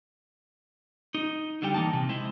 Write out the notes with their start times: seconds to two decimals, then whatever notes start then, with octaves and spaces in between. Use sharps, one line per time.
1.15 D#4
1.62 D3 G3 G5
1.74 E3 A#3 D#4 A5
1.93 C3
2.09 G#3 E4 C5